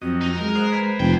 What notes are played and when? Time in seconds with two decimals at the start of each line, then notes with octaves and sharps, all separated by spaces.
0.02 F2 F#3 C4 D#5
0.22 D#4
0.39 G#3 A#4
0.55 C5 D#5 F#5
0.72 B4 C5 G#5
1.00 F1 G2 F4 G5